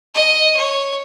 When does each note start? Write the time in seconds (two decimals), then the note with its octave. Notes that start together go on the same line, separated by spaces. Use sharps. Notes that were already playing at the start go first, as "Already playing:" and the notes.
0.15 D#5
0.57 C#5